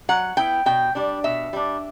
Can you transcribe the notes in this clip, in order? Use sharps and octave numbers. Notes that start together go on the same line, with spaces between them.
F#3 F#5
B3 E4 G5
B2 G5
G3 D4
B2 E5
G3 D4